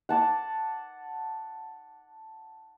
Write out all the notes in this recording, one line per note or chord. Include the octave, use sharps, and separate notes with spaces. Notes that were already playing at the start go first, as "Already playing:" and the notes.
F#5 A5 D6